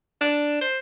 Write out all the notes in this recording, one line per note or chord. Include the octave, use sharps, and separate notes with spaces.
D4
C5